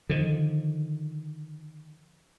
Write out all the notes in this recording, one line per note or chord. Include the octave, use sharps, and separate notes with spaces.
D3 D#3 F3